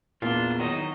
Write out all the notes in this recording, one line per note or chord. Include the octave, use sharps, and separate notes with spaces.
E2 A#2 D4 F4 C6
D#3 F#3 D#4 D#5